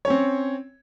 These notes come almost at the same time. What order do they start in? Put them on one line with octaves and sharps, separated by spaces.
C#5 C#4 C4